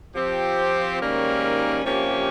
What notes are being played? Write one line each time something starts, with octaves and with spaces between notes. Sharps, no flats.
F3 C4 G4
G#2 D#3 G3 A#3 C#4
C3 F3 A#3 C#4 G4